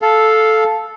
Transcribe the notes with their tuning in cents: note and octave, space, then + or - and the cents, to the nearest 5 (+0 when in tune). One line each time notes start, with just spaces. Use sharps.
A4 -10 F5 +0